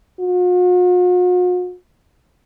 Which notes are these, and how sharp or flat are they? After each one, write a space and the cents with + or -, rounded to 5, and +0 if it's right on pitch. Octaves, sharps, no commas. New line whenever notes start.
F#4 -45